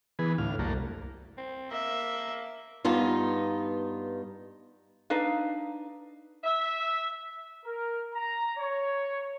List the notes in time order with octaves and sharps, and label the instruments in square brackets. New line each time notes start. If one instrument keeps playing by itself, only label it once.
[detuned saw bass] E3 [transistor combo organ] B3 G#4
[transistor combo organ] D2 F5 [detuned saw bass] A2
[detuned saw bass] C2 [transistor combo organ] F#2 A3 A#3
[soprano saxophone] C4
[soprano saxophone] A#3 [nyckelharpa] E5
[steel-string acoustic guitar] G2 B3 D#4 F4
[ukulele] D4 D#4 B4 F5
[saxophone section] E5
[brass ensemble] A#4
A#5
C#5